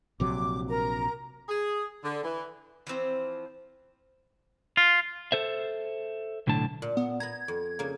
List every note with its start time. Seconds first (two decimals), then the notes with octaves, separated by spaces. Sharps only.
0.20 A#1 C3 F#3 D6
0.68 A#4 A#5
1.48 G#4
2.03 D3
2.24 E3
2.87 E3 F3 C4 C5
4.77 F4
5.32 A4 C5 E5
6.47 B1 A2 D3 A5
6.82 A#2
6.97 B3
7.20 B3 A#5 G#6
7.48 F2
7.79 C#3 A#3